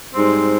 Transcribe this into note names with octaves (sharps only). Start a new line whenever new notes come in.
G#2 G3 C4